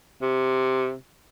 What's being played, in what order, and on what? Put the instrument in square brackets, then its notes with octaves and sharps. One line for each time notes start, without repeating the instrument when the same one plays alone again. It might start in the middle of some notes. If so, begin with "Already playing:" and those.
[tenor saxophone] C3